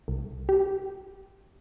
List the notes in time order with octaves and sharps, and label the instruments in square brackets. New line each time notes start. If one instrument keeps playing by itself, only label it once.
[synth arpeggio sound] C2
G4